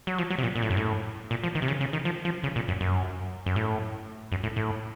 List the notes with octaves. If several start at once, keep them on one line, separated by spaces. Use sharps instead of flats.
F#3
F3
F#3
C3
A#2
A#2
A2
F#2
A2
A#2
F3
D#3
C3
C#3
C#3
D#3
F3
F3
C#3
A#2
F#2
F#2
F#2
A2
F#2
A2
A2